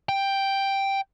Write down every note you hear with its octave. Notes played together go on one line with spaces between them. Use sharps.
G5